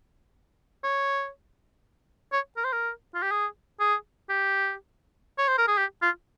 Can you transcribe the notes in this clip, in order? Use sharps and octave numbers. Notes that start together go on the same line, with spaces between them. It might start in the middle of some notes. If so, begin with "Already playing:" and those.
C#5
C#5
A#4
C5
A#4
F4
G4
G#4
G#4
G4
C#5
C5
A#4
G#4
G4
F4